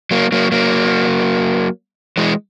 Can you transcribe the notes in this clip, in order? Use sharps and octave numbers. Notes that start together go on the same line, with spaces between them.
F#3 A#3
F#3 A#3
F#3 A#3
E3 G#3